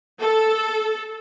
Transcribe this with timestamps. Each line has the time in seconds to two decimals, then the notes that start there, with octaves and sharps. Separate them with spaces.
0.21 A4